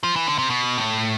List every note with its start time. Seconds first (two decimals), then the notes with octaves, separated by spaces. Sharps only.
0.04 F3
0.16 E3
0.27 D3
0.38 C3
0.50 B2
0.78 A2